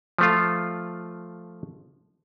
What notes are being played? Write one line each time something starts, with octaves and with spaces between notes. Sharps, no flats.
F3 A3 F4